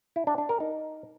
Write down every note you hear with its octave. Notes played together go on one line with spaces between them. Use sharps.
E4
D4
D4
A#4
D#4